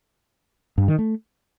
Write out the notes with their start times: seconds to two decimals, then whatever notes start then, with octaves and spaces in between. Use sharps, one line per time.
0.78 G2
0.88 D#3
0.99 A3